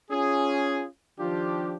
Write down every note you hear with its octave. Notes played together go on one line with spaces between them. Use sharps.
C#4 F4 G#4
D#3 F3 D4 F4 G4